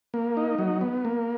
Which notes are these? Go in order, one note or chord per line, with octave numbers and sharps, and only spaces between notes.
A#3
D#4
F#3
B3
A#3